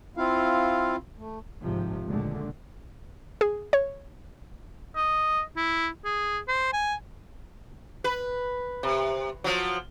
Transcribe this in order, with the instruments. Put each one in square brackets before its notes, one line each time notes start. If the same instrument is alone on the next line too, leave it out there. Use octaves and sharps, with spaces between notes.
[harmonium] C4 E4 F4 F5
A3
[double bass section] G#1 C3 F3
C#2 A#2 D3 G#3 A3
[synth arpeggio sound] G#4
C#5
[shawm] D#5
E4
G#4
C5
G#5
[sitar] B4
C3
F3 F#3